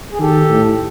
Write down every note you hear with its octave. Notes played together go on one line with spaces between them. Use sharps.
G#4
D#3 G4 A4
A2